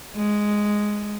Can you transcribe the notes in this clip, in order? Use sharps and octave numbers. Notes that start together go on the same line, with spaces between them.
G#3